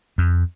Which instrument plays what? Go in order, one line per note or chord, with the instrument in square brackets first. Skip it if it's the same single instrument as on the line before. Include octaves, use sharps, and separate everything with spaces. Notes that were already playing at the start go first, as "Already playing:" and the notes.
[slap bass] F2